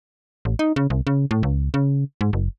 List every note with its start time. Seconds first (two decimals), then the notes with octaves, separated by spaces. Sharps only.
0.45 A1
0.59 D#4
0.76 C#3
0.90 C2
1.07 C#3
1.31 A2
1.43 C#2
1.74 C#3
2.21 G#2
2.33 F#1